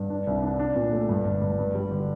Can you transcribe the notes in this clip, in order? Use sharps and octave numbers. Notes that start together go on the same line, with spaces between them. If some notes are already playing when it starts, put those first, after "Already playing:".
Already playing: G2
D4
C2
D4
D4
A#2
A3
G2
G1
G2
G2
G3
D3